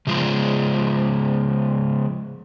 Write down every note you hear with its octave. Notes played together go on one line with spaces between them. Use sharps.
C#3 F3 G#3 G#4